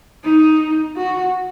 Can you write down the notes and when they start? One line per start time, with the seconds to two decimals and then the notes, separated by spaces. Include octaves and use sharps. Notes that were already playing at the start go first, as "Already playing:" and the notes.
0.24 D#4
0.96 F#4